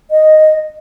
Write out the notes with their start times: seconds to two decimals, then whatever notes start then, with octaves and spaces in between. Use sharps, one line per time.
0.11 D#5